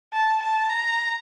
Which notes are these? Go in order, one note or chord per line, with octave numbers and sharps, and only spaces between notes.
A5
A5
A#5